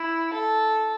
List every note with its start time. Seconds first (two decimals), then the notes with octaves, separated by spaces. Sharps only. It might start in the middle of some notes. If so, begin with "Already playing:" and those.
Already playing: E4
0.33 A4